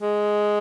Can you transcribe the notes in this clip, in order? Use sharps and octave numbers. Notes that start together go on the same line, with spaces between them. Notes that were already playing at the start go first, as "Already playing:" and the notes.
G#3